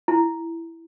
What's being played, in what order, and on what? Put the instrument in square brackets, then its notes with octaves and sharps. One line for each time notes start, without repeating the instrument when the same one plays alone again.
[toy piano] E4